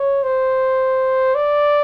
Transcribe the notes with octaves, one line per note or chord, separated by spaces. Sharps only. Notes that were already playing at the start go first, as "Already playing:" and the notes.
Already playing: C#5
C5
D5